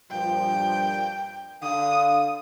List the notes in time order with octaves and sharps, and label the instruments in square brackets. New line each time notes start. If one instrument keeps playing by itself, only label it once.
[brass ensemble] G2 A#2 F3 [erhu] G5
[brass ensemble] D3 F5 [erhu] D#6